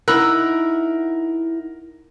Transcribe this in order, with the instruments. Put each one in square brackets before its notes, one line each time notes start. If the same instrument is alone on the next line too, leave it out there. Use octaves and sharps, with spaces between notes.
[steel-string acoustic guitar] D#4 E4 F#5 [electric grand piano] A#4 [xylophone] B5 E6 F#6